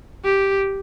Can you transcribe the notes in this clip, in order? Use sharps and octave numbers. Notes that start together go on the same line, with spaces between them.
G4